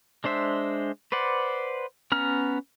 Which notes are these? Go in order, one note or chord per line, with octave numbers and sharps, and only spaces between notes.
G#3 D4 C5 E5
B4 C5 D5 F#5
B3 C#4 A#5 F6